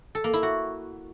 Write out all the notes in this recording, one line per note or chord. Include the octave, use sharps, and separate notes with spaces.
A4
A#3
E4
F#4